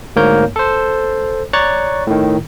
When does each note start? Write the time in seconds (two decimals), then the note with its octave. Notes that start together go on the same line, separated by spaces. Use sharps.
0.16 D2 G#2 A#3 A#4 C#5 G6
0.56 A4 C5
1.53 C#5 D5 A#5 C#6 F#6 A6
2.07 A2 D#3